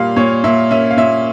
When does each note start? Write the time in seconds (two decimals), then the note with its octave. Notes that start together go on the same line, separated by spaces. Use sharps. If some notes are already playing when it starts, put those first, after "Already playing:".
Already playing: A#2 G3 F5
0.16 A#2 C#5
0.44 A#2 E5
0.71 C#4 E5
0.91 F5
0.97 A#2 E5